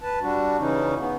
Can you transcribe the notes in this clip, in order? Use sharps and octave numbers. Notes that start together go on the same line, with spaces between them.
B4 A5
G3 D4 F#4
C#3 E3 C#4 D#4
B3